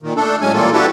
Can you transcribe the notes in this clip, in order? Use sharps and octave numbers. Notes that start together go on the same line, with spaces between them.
A#2 D#3
A3 D4 A4
A2 F#3 G#3 C#4 G#5
A#2 E3 G3 A#3 F4 A4
D4 E4 F#4 G4 A4 B4